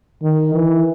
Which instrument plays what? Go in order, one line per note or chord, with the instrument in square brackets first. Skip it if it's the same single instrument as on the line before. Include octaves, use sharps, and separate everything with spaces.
[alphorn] D#3
E3